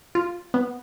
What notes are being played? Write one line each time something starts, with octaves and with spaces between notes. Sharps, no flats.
F4
B3